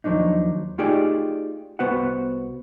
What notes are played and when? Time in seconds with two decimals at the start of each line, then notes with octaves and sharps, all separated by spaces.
0.04 D#2 F3 F#3 D4 D#4
0.78 A3 D#4 F4 G4 G#4 D5
1.79 C2 B3 F#4 B4 C5 F#5